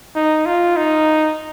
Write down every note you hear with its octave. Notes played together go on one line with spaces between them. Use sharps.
D#4
F4
D#4